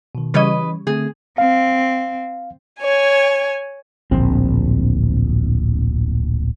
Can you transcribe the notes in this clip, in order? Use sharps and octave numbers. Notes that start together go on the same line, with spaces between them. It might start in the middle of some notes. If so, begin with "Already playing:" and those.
B2 D#3
C#3 E3 G3 B4 C#5 D#5
D3 A3 C4 G#4
C4 F5
C#5 G#5
D1 A#1 C4